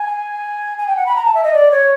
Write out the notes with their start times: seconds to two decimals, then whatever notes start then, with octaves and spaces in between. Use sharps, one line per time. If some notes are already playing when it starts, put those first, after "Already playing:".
Already playing: G#5
0.78 G#5
0.87 G5
0.96 F#5
1.06 B5
1.15 A#5
1.25 A5
1.34 E5
1.43 D#5
1.53 D5
1.71 C#5